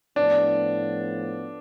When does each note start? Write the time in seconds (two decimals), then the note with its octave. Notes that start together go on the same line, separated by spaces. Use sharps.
0.16 A2 F3 B3 D4